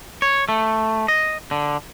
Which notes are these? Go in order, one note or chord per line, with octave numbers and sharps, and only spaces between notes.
C#5
A3
D#5
D3